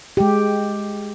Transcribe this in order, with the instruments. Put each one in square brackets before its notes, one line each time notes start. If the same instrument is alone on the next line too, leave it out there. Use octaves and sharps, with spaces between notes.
[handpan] G#3 G4